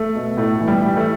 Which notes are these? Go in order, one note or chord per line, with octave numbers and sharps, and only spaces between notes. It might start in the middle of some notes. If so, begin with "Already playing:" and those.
Already playing: A3
B2
A2 A3
E3
G3
E3
A3